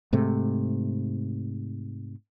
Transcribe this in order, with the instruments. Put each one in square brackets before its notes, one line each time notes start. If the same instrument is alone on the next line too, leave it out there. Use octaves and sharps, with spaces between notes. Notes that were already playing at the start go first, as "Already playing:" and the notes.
[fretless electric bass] G#2 C3 A3